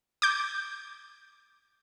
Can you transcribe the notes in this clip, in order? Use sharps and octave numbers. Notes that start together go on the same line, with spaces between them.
D6 G6